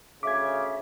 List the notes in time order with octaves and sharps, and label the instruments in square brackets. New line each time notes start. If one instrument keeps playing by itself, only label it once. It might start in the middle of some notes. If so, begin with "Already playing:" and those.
[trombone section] D2 C#3 [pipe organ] E5 [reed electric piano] D6 G#6